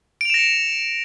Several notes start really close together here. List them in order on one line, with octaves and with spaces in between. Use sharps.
D7 F7 E7 A#6 C#7